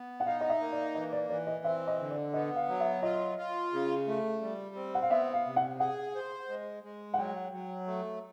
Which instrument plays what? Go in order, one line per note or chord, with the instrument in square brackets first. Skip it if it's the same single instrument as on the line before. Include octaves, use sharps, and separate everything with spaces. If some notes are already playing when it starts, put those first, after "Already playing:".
Already playing: [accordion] B3
[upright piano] F#5
[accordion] D#4 [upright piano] F5
[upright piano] D#5
E5
[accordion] A#3
[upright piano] D5
[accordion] E3 [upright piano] D#5
[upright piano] D5
[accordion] E3 [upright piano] D5
[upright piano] D#5
[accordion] C4 [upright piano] E5
[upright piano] D#5
[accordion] D3
[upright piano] D5
[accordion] B3 [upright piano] D#5
[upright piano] F5
[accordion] F#3
[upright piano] E5
[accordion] F4 [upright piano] D#5
[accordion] F4
C#3
A3
G3
C4
[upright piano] F#5
F5
[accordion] B3 [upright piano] E5
[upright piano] F5
[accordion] C3
[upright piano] F#5
[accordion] G#4 [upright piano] F#5
[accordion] C5
G#3
G#3
[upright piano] F#5
[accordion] F#3 [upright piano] G5
[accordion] F#3
A3